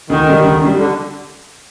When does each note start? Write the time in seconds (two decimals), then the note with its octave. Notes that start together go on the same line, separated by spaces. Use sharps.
0.09 D2 D#3
0.27 D3 G3
0.43 D2
0.61 D3 G3
0.78 D3